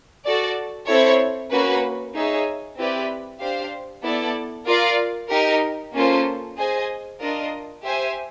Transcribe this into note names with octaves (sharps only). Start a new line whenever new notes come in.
F#4 A4 D5
C4 E4 A4 C#5
A#3 C#4 F#4 B4
D#4 G#4 C#5 E5
C4 E4 G4 B4 D5
D4 G4 C5 F5
B3 E4 A4 D5
F4 A#4 D5 F5
D#4 G4 A#4
A#3 C#4 F4 A4 C5
G#4 C5 D#5 G#5
D4 F4 A#4 D#5
G4 C5 E5 G#5